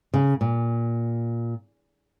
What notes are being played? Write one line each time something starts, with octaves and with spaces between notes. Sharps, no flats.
C#3
A#2